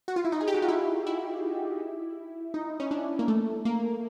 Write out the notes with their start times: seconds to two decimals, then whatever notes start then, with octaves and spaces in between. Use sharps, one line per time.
0.08 F#4
0.16 F4
0.25 E4
0.32 D#4
0.40 G#4
0.47 G4
0.54 F#4
0.62 F4
0.68 E4
1.07 E4
2.54 D#4
2.80 C#4
2.91 D4
3.19 A#3
3.28 A3
3.65 A#3